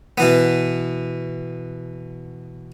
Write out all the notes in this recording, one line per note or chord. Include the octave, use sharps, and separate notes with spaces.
B2 E3 B3